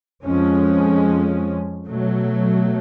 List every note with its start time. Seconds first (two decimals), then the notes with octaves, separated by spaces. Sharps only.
0.24 F2 F3 G#3 C#4
1.86 B2 F#3 A3